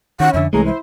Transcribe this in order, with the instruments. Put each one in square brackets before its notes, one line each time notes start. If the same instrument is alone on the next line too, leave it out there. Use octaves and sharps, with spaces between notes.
[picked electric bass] D#3 [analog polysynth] C#4 [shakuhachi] F#5
[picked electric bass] F2 D3 [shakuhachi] E5
[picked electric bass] C2 E3 G#3 [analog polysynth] A3 C#4 A#5 [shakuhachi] G#4
[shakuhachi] E4 [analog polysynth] C5